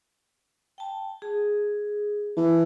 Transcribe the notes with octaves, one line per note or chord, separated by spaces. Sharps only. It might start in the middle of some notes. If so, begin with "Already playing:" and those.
G5 A5
G#4
E3 A5